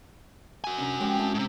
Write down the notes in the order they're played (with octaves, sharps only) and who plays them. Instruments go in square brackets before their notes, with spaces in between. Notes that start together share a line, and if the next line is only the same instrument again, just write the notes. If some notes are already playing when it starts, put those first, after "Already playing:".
[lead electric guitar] F#4 G#5
[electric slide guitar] C3 C#4 [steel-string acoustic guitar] D4 A#5
[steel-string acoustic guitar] F3 G4 G5 [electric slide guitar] G#3 C#4
[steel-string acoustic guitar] C4 E4 A5
[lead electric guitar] G#2 C3